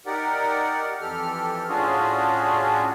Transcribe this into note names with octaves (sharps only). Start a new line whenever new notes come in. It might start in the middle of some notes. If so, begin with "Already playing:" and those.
D#4 G4 A#4 D5 F#5
F2 E3 G4 A4 F6
A2 C#4 D4 F4 F#4 G#4